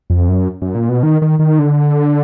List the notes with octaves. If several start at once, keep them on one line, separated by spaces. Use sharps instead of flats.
F2
F#2
F#2
A#2
B2
D#3
D#3
D#3
D3